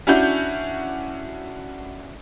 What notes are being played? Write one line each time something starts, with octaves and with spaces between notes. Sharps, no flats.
C#4 D4 E4 F#4 G6